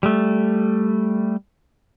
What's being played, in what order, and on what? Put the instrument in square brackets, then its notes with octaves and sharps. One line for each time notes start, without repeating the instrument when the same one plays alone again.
[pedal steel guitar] G3 A3